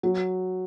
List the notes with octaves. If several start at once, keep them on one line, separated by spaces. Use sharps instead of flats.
F#3